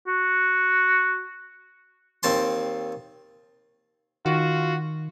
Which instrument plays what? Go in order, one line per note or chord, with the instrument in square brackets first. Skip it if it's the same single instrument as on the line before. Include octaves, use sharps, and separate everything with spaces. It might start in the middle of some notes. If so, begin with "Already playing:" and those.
[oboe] F#4
[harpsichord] D#2 C4 A5 C6
[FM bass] D#3 [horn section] F4 F#4